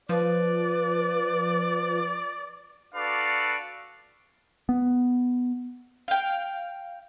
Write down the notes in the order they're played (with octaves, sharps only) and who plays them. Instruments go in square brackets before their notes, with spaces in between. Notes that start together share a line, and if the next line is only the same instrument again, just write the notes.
[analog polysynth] F3 [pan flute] B4 [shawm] D5
[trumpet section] D4 F#4 A4 B4 D5 F5
[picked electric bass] B3
[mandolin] F5 G5